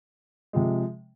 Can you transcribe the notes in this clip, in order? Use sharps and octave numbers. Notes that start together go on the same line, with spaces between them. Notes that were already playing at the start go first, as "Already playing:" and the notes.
C3 F3 G#3